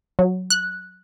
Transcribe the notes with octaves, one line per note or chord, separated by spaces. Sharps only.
F#3
F#6